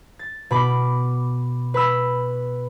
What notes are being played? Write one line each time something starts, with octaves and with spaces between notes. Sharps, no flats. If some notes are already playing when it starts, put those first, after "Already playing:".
A6
B2 B5 D6
B4 B5 E6